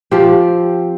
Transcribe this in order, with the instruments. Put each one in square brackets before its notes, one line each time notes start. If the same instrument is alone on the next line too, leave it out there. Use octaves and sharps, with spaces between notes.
[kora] F3 C4 G4